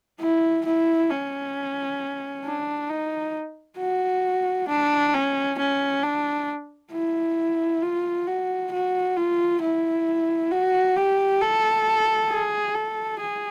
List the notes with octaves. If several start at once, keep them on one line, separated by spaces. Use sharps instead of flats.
E4
E4
C#4
D4
D#4
F#4
D4
C#4
C#4
D4
E4
F4
F#4
F#4
F4
E4
F#4
G4
A4
G#4
A4
G#4